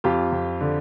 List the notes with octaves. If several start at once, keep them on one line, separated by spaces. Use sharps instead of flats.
F2 F4 G4
F2
D3